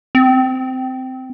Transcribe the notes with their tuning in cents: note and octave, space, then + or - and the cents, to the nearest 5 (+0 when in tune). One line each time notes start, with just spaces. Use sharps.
C4 -15